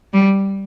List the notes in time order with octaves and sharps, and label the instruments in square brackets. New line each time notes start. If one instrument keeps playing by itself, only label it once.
[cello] G3